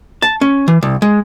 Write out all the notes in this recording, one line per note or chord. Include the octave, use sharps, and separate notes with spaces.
A5
C#4
E3
C2
G#3